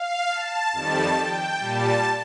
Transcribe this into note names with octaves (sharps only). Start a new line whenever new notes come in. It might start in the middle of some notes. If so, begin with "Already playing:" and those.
Already playing: F5
A5
F2 D#3 G3 A5
G5
A#2 G3 A5